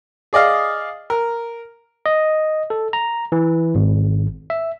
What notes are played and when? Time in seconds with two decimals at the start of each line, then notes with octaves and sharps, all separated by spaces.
0.33 G#4 D5 D#5 F5
1.10 A#4
2.06 D#5
2.70 A4
2.93 A#5
3.32 E3
3.75 G#1
4.50 E5